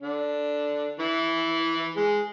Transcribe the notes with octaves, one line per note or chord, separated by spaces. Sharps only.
D3 D4
E3 E4
G#3 G#4